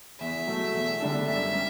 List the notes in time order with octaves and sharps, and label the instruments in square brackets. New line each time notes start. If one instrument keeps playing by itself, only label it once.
[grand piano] E2 [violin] E5
[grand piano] B2 F#3 A3
E2
D3 G3 D4 A4
[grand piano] F#2 [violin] E5
[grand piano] G3 C#4